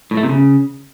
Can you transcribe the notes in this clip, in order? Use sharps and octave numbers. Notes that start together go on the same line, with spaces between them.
A2
A3
C3
C#3